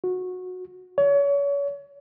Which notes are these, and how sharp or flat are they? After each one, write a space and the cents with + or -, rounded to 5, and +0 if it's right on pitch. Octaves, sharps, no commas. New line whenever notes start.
F#4 -20
C#5 +35